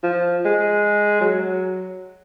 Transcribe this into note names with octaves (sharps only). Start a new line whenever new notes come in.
F3
G#3
F#3